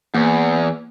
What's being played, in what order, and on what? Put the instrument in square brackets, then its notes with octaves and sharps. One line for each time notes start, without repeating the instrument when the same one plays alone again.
[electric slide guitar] E2 [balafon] A#3